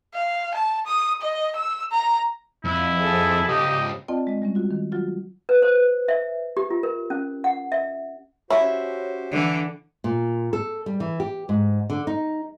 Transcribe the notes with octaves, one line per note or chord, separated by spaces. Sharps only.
F5
A5
D#6
D#5
E6
A#5
F2 E4
G#4 A4
C#2 F3 G4 D#5
C4 F4 D5 D#5 G5 A5
G#3 D#5
G3 G#3 C#4
F4 F#4
D#3
F#3 F4 F#4
B4
C5
E5
G4
F4
A#4
C#4
F#5
E5
C#4 E4 F#4 G4 C5
D3 E3
A#2
A4
G3
E3
G4
G#2
D3
D#4